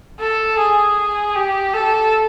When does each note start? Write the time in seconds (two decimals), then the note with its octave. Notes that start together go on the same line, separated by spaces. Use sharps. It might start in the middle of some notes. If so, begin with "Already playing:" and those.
0.19 A4
0.58 G#4
1.35 G4
1.73 A4